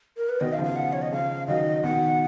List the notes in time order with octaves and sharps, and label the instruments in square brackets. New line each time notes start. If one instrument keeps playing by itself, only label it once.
[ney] A#4
B4
[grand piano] B2 D#3 [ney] D#5
[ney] F5
[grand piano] C#3 F3
[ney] F5
F#5
C#5
D#5
[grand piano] C#3 F3 [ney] F5
[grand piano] D#3 F#3 [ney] D#5
[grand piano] B2 D#3 [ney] F#5